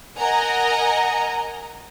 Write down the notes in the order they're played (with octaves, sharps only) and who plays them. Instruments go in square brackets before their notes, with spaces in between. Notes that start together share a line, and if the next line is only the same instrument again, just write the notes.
[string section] A#4 D#5 F#5 G#5 A#5